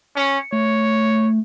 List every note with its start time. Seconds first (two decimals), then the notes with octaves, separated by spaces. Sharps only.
0.16 C#4 C#7
0.53 A3 C#5